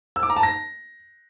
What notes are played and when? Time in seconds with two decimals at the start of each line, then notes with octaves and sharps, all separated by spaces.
0.16 E6
0.23 D6
0.30 A#5
0.36 A5
0.43 A#6